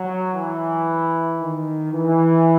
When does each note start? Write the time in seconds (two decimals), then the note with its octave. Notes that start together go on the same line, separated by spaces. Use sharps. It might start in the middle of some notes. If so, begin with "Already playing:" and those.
Already playing: F#3
0.34 E3
1.40 D#3
1.93 E3